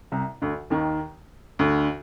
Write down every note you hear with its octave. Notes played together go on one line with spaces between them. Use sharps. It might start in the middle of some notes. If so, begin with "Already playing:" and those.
C2 C3
D2 D3
D#2 D#3
D2 D3